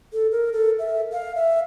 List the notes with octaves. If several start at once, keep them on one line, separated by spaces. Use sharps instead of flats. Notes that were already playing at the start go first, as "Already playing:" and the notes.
A4
A#4
A4
E5
F5
E5